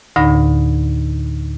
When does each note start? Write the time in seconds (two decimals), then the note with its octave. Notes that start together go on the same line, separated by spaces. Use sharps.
0.16 D2 A2 D3 D#4 B5 A#6